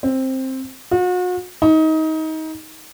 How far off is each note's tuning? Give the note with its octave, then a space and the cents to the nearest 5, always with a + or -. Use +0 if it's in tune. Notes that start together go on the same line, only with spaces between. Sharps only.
C4 +10
F#4 -40
D#4 +25